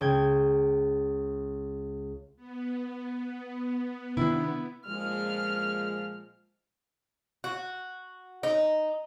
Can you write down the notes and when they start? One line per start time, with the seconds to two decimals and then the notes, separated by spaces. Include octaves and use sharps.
0.01 C#2 G5 G#6
2.36 B3
4.17 C3 D#3 D4 E4
4.87 A#2 F3 G#3 F6
7.44 F#4
8.43 D#4